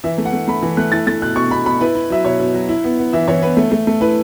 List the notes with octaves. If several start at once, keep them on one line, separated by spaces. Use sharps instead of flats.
E3 E5
A3
F#5
A3
A3 B5
E3
A3 F#6
E4 A6
A3 A6
B2 F#6
B2 C#6
B2 B5
B2 B5
E4 B4
E4
F#3 E5
B2 C#5
B2
F#3
E4
B3
B3
E3 E5
E3 C#5
B3 B4
A3
A3
A3
E4 B4